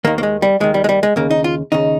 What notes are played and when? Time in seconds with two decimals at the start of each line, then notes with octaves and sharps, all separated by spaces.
0.04 D#2 D#3 A#3
0.18 A#3
0.23 G#3
0.42 G3
0.60 D#2 D#3 G#3
0.74 G3
0.84 G#3
0.89 G3
1.03 G#3
1.16 D#2 C#3 A#3
1.31 D#4
1.44 F4
1.72 D#2 C#3 D#4